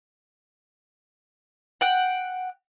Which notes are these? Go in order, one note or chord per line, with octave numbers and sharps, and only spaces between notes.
F#5 G5